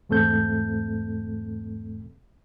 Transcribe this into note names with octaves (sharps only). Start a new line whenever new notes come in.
E2 G#2 A3 C4 A4 G6